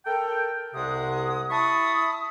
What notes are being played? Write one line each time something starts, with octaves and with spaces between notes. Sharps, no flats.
A4 A#4 G5
C2 C3 G#3 F#5 D#6
E4 A5 B5 C#6 D#6